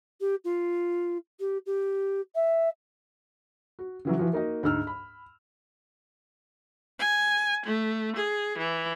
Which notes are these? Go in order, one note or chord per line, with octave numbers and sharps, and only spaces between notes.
G4
F4
G4
G4
E5
F#4
C#3 E3 F#3
E3 F3 F#4
A#3 D#4 F#4 D#5
D2 G#2 E6 F6
B5
G#5
A3
G#4
E3